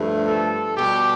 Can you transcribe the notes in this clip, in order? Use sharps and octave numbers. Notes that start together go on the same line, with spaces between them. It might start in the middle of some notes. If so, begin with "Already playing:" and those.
Already playing: G2 F3 A3
A4
B2 G3 G4